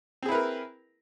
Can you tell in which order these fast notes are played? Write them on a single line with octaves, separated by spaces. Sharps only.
C4 G#4 E4 B4 A#4